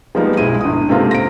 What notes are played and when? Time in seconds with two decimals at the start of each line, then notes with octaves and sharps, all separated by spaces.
0.15 F3 G3 G#3 A#3 B3 D#4
0.37 B1 G#3 E4 D#7
0.61 G1 D#6
0.89 G#2 C3 A3 A#3 C4 F4
1.11 A#6 D7